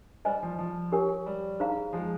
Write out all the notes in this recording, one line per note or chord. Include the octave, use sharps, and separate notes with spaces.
G3 C5 D#5 G#5
F3
F3
G4 A#4 C#5 G#5 C#6
G3
D#4 G#4 C5 F5 A#5
F3 G#3